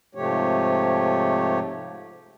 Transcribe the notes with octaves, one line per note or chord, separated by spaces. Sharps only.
G#2 C3 F3 A3 G4 C#5